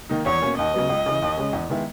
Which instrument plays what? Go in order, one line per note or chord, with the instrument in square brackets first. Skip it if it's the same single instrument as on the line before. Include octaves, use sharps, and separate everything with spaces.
[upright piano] D#3 A#3 D#4
[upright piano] E2 [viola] C#5
[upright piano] B2 A#3 C#4
[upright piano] D#2 [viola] D#5
[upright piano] C#3 F#3 B3
C#2
C#3 E3
D#2
C#3 G#3 C#4
E2
D#3 G#3 B3 E4